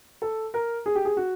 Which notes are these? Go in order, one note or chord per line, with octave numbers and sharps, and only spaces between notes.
A4
A#4
G#4
G4
G#4
F#4